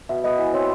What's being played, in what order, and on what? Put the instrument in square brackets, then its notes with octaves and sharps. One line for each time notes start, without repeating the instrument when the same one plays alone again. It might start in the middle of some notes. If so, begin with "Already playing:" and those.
[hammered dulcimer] B2 [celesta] E5
[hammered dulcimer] B3 [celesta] D#5
[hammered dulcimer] E3 [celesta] D#5
[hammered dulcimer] C4 [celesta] C#5